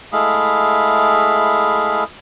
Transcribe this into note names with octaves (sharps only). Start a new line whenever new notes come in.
G#3 A3 E4 G#4 F5 B5